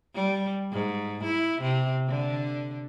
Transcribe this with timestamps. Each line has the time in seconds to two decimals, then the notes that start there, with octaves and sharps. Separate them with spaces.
0.15 G3
0.72 G#2
1.24 E4
1.61 C3
2.08 D3